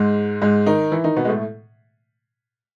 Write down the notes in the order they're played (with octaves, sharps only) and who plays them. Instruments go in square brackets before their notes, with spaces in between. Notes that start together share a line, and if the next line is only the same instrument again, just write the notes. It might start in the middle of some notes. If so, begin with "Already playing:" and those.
Already playing: [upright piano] G#2 G#3
G#2 G#3
D#3 D#4
E3 E4
D#3 D#4
B2 B3
G#3
A2 A3